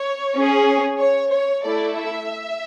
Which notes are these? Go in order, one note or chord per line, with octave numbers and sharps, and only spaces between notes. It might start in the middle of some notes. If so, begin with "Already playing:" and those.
Already playing: C#5
C#4 G#4
C#5
C#5
A3 E4 A4 D5
E5